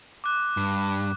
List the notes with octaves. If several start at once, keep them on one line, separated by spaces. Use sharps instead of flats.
D6 F#6
G2